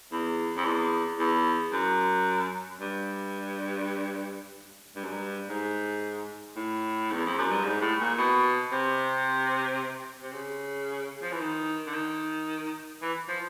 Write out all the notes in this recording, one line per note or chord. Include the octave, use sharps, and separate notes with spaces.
E2
F2
E2
E2
F#2
G2
G2
F#2
G2
G#2
A2
E2
F2
F#2
G2
G#2
A2
A#2
B2
C3
C3
C#3
F3
E3
D#3
D3
D#3
E3
F3